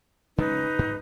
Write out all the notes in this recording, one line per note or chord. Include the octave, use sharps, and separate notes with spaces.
C#3 G#3 C#4 D#4 B4
G#2